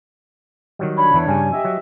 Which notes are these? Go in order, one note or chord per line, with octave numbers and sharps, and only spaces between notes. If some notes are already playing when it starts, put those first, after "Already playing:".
D#3 F#3 G3
D4 C#5 B5
E2 E3
G2 C#3 G3 G#5
G4 D#5 E5
F#3